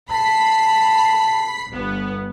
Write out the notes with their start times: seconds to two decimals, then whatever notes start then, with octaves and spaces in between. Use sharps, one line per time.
0.11 A5 B5 B6 C7
1.72 G1 B3